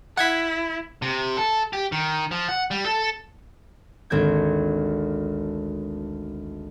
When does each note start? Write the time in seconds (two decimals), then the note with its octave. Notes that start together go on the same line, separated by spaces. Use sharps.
0.17 E4 F#5 G#6 B6
1.02 C3
1.37 A4
1.73 G4
1.92 D#3
2.31 F3
2.49 F#5
2.71 G3
2.86 A4
4.10 G#1 D2 C4 G6 G#6